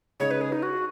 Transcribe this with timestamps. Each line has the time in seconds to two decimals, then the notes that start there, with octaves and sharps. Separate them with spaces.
0.20 C#3 G#3 D#4 C#5
0.31 B4
0.41 G#4
0.52 D#4
0.63 F#4